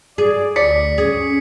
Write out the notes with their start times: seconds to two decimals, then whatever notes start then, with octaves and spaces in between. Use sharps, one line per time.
0.18 G#4 D5
0.56 D2 D5 B6 C#7
0.98 C#4 G#4